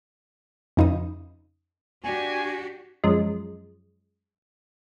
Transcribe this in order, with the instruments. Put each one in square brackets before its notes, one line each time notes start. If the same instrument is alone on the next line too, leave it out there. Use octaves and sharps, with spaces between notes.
[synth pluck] F2 C#3 D#4 F4 B4 D#6
[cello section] D4 F#4 G4 [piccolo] G#5
[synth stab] F#2 F3 G#3